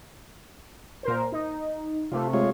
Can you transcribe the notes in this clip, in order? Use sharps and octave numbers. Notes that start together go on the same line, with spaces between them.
A#2 A#4 C5
D#4
C3 A3 F4
G#3 F4 C#5